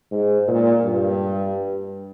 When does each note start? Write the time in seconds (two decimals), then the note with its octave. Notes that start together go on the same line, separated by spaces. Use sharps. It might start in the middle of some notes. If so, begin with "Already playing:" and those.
0.11 G#2
0.47 A#2
0.84 G2